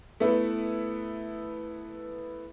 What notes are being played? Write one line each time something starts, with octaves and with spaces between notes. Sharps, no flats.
A3 B3 E4 B4